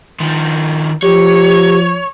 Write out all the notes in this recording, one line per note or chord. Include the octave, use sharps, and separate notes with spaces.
D#3 F3
F3 G4 C#5